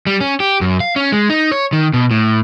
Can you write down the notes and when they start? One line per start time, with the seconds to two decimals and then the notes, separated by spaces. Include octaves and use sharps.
0.07 G3
0.21 C#4
0.40 G4
0.61 F#2
0.80 F5
0.96 C#4
1.12 G#3
1.30 D#4
1.52 C#5
1.73 D#3
1.93 B2
2.11 A2